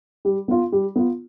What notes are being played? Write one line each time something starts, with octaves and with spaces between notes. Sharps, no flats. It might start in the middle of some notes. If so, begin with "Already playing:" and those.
G3
B3 F4
G3
B3 F4